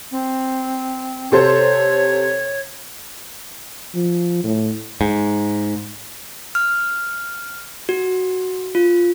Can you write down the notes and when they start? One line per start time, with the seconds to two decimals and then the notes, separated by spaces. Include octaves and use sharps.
0.11 C4
1.32 C3 A4 C5 C#5
3.94 F3
4.44 A2
5.01 G#2
6.55 F6
7.89 F#4
8.75 F4